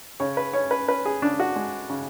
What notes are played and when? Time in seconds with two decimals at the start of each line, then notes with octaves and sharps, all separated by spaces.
0.20 C#3 C#5
0.37 B4
0.53 C#4 C#5
0.71 B4
0.88 C#4 B4
1.06 G#4
1.22 C#3 D4
1.40 F#4
1.56 G#3
1.90 C#3